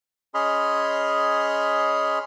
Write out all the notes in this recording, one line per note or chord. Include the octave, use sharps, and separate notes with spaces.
C#4 G#4 D#5 B5 C6 F6